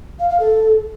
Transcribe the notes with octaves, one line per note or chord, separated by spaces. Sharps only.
F5
F5
A4